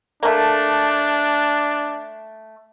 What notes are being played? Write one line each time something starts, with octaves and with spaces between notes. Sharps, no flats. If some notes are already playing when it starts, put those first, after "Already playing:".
A3 A#3 D4